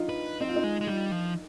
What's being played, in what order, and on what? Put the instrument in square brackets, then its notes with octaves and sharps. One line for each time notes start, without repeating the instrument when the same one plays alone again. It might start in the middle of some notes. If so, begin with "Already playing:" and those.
Already playing: [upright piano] D4 D#4 F4
[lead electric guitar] B4
[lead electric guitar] C4 [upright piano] D#4
[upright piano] F4
D#4
[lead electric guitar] G#3
G#3
[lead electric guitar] G3 [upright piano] F4
[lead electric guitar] F3